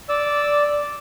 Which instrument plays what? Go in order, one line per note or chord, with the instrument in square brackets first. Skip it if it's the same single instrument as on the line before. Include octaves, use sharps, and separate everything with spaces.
[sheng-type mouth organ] D5 E6